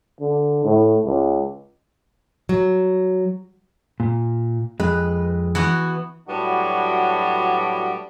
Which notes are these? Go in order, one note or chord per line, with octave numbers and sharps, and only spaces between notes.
D3
A2
C#2
F#3
A#2
F2 G#3 B4
E3 B3 F#4
A2 F#3 G3 B3 D4 F#4